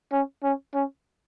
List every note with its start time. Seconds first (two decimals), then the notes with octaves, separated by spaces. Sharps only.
0.12 C#4
0.43 C#4
0.75 C#4